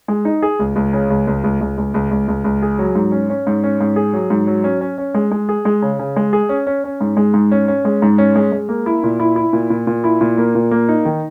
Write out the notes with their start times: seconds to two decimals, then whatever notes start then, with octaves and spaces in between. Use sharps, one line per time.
0.08 G#3
0.25 D#4
0.42 G#4
0.59 C#2
0.76 C#2
0.93 C#3
1.10 C#2
1.27 C#2
1.44 C#2
1.61 C#2
1.78 C#2
1.94 C#2
2.11 C#2
2.28 C#2
2.44 C#2
2.62 G#4
2.79 F#3
2.95 G#2
3.12 C#4
3.30 C#4
3.47 G#2
3.64 C#4
3.81 G#2
3.96 G#4
4.13 F#3
4.30 G#2
4.47 F#3
4.64 C#4
4.81 C#4
4.98 C#4
5.14 G#3
5.31 G#3
5.49 G#4
5.65 G#3
5.82 C#3
5.99 C#3
6.16 G#3
6.33 G#4
6.49 C#4
6.67 C#4
6.84 C#4
7.01 G#2
7.17 G#3
7.34 G#2
7.52 C#4
7.68 C#4
7.85 G#3
8.02 G#2
8.18 C#4
8.36 G#3
8.52 G#3
8.69 A#3
8.86 E4
9.03 A#2
9.20 E4
9.36 E4
9.53 A#2
9.70 A#2
9.87 A#2
10.04 E4
10.21 A#2
10.38 A#3
10.55 A#2
10.71 A#3
10.89 D#4
11.05 D#3